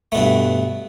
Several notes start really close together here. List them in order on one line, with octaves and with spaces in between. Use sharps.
A3 B2 G2